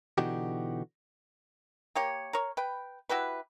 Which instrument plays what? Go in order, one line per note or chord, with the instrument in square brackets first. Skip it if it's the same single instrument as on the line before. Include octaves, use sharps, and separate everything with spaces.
[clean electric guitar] B2 D3 E3 D#4 F#4 G4
[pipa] A#3 G4 C#5
A#4 C#5
B4 G5
E4 F#4 G4 B4